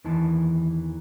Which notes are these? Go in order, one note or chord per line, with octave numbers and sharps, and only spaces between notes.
E2 D#3 E3 A5